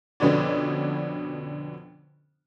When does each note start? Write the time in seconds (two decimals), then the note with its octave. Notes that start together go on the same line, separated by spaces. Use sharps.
0.20 F2 B2 D3 B3 C#4 D4